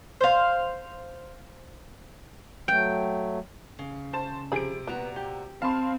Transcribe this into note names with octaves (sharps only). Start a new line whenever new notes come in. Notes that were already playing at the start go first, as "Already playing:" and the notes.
C5 F5
F#3 A3 G5
C#3
C5 A5 E7
C3 F3 G#4 B5 D7
A#2 B3 F#4 A#5
G4
C4 F5 A5 B5 C6